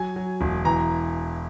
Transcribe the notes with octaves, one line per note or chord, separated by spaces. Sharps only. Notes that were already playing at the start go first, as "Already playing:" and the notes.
Already playing: F#3 G#5
F#3
E1
E3 A#5